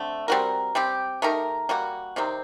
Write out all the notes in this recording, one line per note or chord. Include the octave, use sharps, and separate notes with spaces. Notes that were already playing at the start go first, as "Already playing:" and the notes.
Already playing: D3 A3 C4
G3 C4 F#4 A#4
G3 C4 G4
A3 D#4 G4 A#4
G3 A#3 F#4
C3 D#3 G3 C4